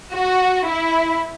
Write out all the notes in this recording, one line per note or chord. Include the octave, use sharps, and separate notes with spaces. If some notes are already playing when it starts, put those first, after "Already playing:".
F#4
E4